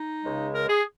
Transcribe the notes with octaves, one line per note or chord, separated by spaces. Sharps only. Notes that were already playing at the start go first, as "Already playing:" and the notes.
Already playing: D#4
C#2 C#3 G#3
A#4
G#4